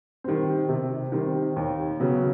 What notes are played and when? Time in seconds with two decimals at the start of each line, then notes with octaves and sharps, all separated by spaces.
0.24 D#3 G3 C4
0.69 C3
1.12 D#3 G3 C4
1.56 D#2
2.00 C#3 F#3 B3